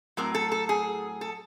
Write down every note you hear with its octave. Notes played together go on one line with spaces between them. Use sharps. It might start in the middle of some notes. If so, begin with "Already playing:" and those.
A2 F#3 A3 C4 A#4
A4
A4
G#4
A4